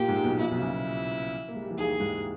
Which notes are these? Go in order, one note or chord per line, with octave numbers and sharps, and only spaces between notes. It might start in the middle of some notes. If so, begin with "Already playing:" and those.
Already playing: A#2 A#3 G4
G#2 G#3
B1 B2
A#1 A#2 E4
B1 B2
C#3
B1 B2
A#3
G#3
G3
E3
D#2 D#3 G#4
G#2 G#3